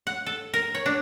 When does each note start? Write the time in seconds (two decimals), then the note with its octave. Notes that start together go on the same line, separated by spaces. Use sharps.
0.07 F#5
0.26 A4
0.54 A#4
0.75 C#5
0.86 D4